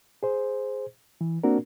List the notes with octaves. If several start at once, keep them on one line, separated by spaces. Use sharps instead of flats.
G#4 C5
E3
A#3 C4 D4 F#4 A#4